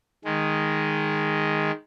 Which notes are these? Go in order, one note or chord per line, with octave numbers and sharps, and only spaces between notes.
D#3 G#3